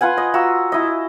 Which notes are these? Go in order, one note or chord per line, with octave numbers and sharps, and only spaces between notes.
F4 B4 F#5 G#5
D#5
F4 F#4 A#5 E6
E4 D#5